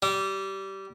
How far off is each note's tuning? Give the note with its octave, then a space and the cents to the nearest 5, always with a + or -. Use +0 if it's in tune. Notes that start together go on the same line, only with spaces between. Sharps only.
G3 -20